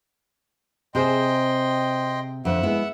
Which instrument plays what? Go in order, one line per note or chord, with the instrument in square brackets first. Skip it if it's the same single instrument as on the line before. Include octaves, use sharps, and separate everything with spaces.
[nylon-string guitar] C3 C4 G#4 [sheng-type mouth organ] D#5 G5 C6
[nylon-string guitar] F2 D3 [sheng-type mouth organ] E5 F#5
[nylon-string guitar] G#3 B3 E4